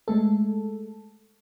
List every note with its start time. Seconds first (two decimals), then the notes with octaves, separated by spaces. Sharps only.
0.08 G#3 A3 A4